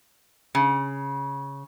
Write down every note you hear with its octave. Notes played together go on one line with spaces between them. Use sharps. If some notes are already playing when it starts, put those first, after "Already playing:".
C#3